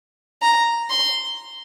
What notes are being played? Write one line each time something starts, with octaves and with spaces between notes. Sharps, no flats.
A#5
C6